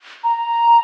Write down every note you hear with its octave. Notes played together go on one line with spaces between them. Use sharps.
A#5